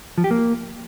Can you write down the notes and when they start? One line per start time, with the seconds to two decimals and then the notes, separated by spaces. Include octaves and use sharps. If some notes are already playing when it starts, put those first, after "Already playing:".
0.18 F3
0.24 G4
0.31 A#3